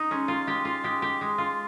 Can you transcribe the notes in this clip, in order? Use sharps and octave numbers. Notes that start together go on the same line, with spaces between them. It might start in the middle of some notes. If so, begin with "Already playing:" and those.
Already playing: D#4
G#3 C#4
F4
G#3 G4
F4
G#3 G4
G4
G#3
F4